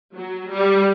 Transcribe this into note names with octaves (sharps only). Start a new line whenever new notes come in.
F#3
G3